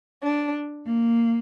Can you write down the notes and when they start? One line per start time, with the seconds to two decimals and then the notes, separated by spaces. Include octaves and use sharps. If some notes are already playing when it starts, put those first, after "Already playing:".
0.22 D4
0.87 A#3